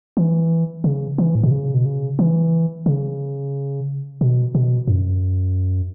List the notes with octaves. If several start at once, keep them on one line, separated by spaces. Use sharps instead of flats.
E3
C#3
E3
A2
B2
C#3
B2
C#3
E3
C#3
B2
B2
F#2